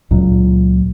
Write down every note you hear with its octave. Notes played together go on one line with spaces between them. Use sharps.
C#2 A#2 F#3